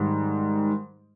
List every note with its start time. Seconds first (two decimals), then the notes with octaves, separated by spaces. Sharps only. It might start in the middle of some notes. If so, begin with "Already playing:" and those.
Already playing: G#2 D#3 G3